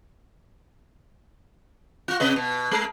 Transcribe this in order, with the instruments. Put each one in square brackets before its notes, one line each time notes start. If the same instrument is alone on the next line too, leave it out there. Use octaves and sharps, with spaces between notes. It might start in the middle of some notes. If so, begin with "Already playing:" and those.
[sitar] F4 F#4
C3 B4 D#5
B2
G#3 A#4